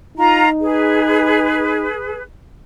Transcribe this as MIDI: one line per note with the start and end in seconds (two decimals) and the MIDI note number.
0.18 1.88 63
0.18 0.48 65
0.18 0.48 82
0.60 2.22 68
0.60 2.22 71